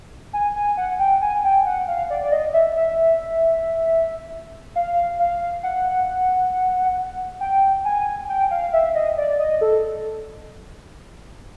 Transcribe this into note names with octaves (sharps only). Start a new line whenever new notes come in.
G#5
G#5
F#5
G5
G#5
G5
F#5
F5
D5
D5
D#5
E5
E5
F5
F5
F#5
G5
G#5
G5
F5
E5
D#5
D5
D#5
A4